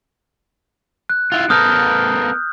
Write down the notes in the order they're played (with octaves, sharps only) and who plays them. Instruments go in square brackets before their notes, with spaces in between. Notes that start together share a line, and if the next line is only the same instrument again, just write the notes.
[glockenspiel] F#6
[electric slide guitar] E4 F4
[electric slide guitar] B3 A4 A#4 [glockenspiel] D#6 F6 G6